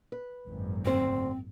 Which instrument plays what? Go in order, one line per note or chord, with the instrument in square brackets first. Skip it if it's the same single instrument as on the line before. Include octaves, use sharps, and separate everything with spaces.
[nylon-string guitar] B4
[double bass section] G#1 F#2 A#2
[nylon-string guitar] D2 C5 [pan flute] C4